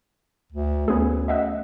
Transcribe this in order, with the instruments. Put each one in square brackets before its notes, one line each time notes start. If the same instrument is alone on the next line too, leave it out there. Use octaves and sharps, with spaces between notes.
[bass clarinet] D2
[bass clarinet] D2 [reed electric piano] A3 C#4 [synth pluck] B3 G#4
[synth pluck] D#5 E5 F#5